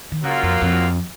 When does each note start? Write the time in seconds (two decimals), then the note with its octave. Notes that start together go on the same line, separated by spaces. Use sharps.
0.12 D#3
0.23 C#3 F#3 A#3 F4
0.43 F2
0.62 F2